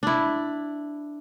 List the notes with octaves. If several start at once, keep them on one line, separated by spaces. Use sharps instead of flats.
D4 E4